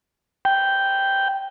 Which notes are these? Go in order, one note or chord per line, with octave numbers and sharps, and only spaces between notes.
G5